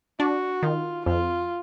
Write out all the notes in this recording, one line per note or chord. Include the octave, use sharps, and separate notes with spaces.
D4 F#4
D#3 F4
F2 F4